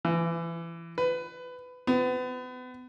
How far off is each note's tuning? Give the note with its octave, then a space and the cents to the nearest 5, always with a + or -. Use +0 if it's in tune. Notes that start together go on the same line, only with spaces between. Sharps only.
E3 +25
B4 +20
B3 +35